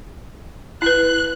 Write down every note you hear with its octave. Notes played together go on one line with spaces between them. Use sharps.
E4 B4 F#6